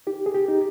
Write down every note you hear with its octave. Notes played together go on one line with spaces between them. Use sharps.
D#4 G4
G#4
G4
D#4